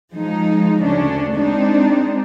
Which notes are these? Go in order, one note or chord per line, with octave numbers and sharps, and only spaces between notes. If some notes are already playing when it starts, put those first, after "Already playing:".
F3 G#3 D#4
D2 C#3 C#4 D4
G#3 C4 D4 D#4